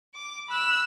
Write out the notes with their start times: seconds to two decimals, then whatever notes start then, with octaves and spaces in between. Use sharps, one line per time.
0.14 D6
0.48 B5 E6 F#6